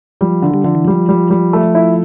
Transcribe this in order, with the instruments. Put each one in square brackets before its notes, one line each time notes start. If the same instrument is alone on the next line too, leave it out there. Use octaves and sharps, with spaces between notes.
[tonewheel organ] F3 [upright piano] G3
[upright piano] D3
[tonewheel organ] G3
[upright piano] D3 [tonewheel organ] F3
[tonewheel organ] E3
[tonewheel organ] F3 [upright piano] G3
[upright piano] G3
G3
A3
E4